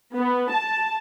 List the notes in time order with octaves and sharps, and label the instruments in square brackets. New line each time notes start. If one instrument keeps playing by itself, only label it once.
[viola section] B3
A5